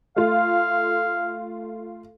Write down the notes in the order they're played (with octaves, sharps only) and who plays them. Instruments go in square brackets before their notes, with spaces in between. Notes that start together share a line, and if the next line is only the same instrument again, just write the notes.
[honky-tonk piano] A3 F4 [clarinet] F5